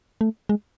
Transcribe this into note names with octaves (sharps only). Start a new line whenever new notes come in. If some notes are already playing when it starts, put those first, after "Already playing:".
A3
G#3